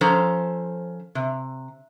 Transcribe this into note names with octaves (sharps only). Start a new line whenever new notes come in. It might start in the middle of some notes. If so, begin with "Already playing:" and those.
F3 C#4 A4 C5 A#5
C3